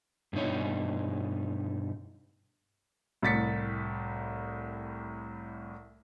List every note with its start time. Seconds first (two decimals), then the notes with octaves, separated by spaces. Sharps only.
0.33 G2 B2 D#4 C#5
3.22 C2 A2 A6 B6 C#7